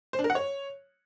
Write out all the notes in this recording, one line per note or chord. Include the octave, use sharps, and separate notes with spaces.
C5
D4
A#4
F#5
C#5